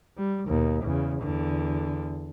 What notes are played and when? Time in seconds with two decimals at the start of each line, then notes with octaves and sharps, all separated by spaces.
0.18 G3
0.47 D#2 B2
0.84 E2 C#3
1.22 E2 D3